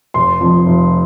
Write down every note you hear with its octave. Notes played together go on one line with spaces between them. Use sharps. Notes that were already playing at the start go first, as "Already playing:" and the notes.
F1 C6
F2 F3
F1